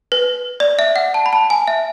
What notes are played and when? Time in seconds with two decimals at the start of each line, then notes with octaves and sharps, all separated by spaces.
0.12 B4
0.60 D5
0.79 E5
0.96 F#5
1.14 A5
1.26 B5
1.33 A5
1.50 G#5
1.67 E5